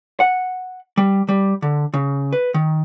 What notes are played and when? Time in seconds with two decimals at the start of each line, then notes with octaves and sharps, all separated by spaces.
0.20 F#5
0.98 G3
1.29 G3
1.62 D3
1.94 C#3
2.33 B4
2.54 D#3